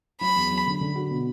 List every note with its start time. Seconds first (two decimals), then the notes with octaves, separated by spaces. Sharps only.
0.21 F#3 B5
0.36 E2
0.51 F#3
0.67 D3
0.81 D3
0.96 F#4
1.11 B2